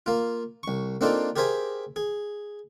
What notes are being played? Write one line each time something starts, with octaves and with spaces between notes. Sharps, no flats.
A#3 F4
C2 C#6
A#3 C4 D4 D#4 F4 A4
G4 G#4 A#4 C5 E5 G#5
G#4